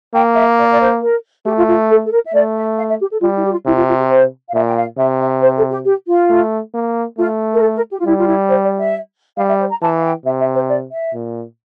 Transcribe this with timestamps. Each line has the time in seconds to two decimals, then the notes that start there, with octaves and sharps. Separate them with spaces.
0.14 A#3 G5
0.35 E5
0.58 D5
0.71 D5
0.80 C5
1.02 A#4
1.46 A3 G4
1.57 F4
1.68 F4
1.90 A4
2.05 A4
2.12 A#4
2.26 E5
2.34 A3 D5
2.56 E5
2.78 F5
2.89 E5
3.00 G4
3.11 A4
3.21 G3 F4
3.37 E4
3.45 G4
3.52 F4
3.66 C3 E4
3.76 F4
3.87 F4
3.99 G4
4.10 C5
4.49 F5
4.54 A#2 E5
4.68 G5
4.76 F5
4.97 C3 E5
5.20 E5
5.42 C5
5.57 A4
5.71 G4
5.85 G4
6.08 F4
6.29 A3
6.74 A#3
7.18 A3 F4
7.53 A#4
7.61 A4
7.76 A#4
7.91 G4
8.00 F4
8.06 G3 E4
8.19 F4
8.27 E4
8.49 C5
8.64 D5
8.79 E5
9.37 G3 F5
9.49 E5
9.59 C5
9.71 A#5
9.81 E3 A5
9.98 F5
10.04 G5
10.25 C3 E5
10.40 E5
10.55 C5
10.69 D5
10.91 E5
11.13 A#2